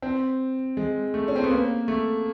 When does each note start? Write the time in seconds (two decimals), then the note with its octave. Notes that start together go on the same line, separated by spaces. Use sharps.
0.02 C4
0.77 G#3
1.14 A3
1.28 C#4
1.36 C4
1.44 B3
1.51 A#3
1.88 A3